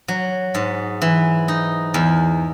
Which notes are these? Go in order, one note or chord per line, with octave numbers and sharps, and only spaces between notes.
F#3
G#2
E3
D#4
E2